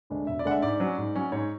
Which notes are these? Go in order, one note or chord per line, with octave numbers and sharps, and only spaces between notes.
D2 D3 G#3 D4
E1 E5
D5
D2 D3 G#3 D4 F#5
E5
G#2 D5
F#3 C#4
G#2
F#3 C#4
G#2 C#5